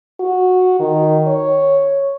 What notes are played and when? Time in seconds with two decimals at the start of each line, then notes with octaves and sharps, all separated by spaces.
0.20 F#4
0.80 D#3
1.28 C#5